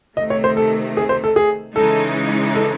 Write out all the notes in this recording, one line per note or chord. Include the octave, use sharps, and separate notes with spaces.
C3 D#3 A3 D#5
C#5
C5
A4
G#4
C5
A4
G#4
C#3 E3 G#3 D#4 A4
A4